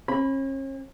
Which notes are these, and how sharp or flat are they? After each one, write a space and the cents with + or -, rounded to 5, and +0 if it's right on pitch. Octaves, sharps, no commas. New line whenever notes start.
C#4 -40 B5 +0